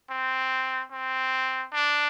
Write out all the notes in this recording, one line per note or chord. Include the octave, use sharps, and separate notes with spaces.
C4
C4
D4